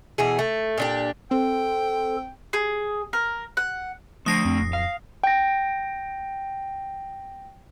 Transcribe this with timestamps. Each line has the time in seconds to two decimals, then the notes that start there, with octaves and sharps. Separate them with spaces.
0.18 B2 E3 G#4
0.39 A3
0.78 A#2 D4 G4
1.31 C4 A4 G5
2.53 G#4
3.13 A#4
3.57 F#5
4.26 F3 A3 D4 D#6 A#6 C7
4.45 F2 C4
4.62 D1
4.73 F5
5.24 G5 A#6